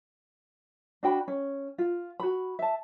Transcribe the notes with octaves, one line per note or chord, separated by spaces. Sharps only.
D4 F#4 G5 B5
C#4
F4
F#4 B5
E5 A5